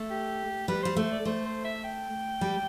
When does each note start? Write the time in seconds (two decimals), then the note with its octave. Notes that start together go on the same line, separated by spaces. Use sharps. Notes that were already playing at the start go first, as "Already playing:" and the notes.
Already playing: A3
0.10 G4
0.68 G3 B4
0.83 G3 C5
0.96 A3 C5
1.12 D5
1.25 A3 C5
1.45 C5
1.64 E5
1.84 G5
2.41 G3